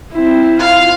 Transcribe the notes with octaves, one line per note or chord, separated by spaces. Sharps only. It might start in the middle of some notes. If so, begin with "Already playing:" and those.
C4 E4
F4 F5